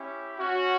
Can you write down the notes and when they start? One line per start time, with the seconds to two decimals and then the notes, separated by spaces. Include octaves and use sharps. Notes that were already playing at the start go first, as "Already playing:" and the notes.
Already playing: C#4 E4 G4
0.37 C#4 F#4